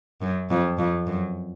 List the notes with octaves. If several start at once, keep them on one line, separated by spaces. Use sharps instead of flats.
F#2
F2
F2
F#2